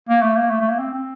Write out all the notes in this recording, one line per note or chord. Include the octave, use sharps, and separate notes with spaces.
A#3
A3
A#3
A3
A3
A#3
C4
C4